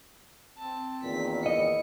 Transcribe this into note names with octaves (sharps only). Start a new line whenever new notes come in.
C4 A5
E2 A#2 D#3 B6
E4 D#5 C#7